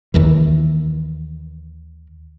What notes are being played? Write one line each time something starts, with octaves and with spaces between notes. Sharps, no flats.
D#2 D#3 E3